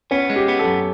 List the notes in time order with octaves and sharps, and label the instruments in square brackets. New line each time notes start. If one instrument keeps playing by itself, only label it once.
[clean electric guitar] B3 [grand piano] C#4
[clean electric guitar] G#3
[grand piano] G4
[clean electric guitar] B3
[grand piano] A4
[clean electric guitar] F#2